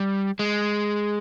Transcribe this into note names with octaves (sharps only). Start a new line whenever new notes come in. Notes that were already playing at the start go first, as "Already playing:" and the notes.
Already playing: G3
G#3